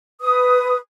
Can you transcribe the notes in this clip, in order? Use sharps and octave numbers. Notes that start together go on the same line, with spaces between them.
B4 D#6